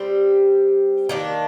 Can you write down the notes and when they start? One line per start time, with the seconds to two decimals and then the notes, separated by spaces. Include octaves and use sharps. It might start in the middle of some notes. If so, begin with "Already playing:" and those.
Already playing: G3 C4 G4
1.09 D#3 A#3 D4